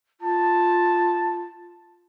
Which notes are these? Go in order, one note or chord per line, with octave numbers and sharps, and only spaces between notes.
F4 A5